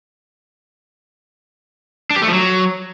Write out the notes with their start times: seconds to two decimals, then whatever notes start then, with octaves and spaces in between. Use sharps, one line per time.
2.11 D4
2.16 G4
2.22 A3
2.28 F3
2.33 F#3